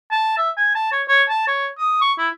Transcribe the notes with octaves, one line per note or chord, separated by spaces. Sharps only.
A5
E5
G#5
A5
C#5
C#5
A5
C#5
D#6
C#6
E4